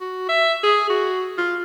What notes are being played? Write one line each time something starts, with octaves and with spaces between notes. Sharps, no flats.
F#4
E5
G#4
F#4
F4